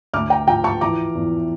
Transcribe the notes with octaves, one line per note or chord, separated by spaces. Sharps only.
D2 D6 F6
G5 A#5
F3 G5 A#5
A5 C#6
E3 A#5 D6
E2